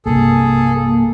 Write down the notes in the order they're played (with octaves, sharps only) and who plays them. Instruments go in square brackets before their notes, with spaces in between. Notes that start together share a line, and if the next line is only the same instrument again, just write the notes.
[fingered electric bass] B1 G2 C3 [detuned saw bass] A#3 [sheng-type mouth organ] G#4 A4